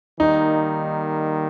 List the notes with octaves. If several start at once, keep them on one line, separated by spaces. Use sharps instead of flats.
D#3 G3 A#3 D#4